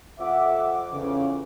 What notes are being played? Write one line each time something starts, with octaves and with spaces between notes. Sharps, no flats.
F2 E5 F#5 D6
E2 C#3